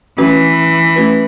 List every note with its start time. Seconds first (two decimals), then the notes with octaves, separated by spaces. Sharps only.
0.18 E3 A3 C#4 F#4 B4
0.96 A3 C#4 F#4 B4